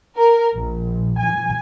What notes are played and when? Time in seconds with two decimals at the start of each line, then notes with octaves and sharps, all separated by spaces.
0.17 A#4
0.55 A#1
1.18 G#5